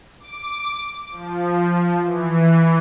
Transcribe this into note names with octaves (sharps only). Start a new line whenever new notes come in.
D6
F3
E3